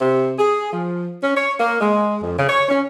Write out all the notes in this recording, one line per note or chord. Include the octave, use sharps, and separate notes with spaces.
C3
G#4
F3
C#4
C#5
A#3
G#3
F2
C#3
C#5
C#4